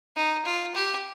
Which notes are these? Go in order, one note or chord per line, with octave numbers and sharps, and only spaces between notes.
D#4
F4
G4